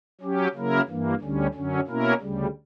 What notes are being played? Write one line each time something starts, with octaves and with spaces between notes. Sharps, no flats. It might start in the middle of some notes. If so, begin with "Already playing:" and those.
F#3 C#4 G4
C#3 F#3 A#3 E4 A#4
G2 E3 A#3
D2 D3 G3 C#4
F#2 D3 F#3 C#4
B2 A#3 C#4 E4 A#4
D2 C#3 G3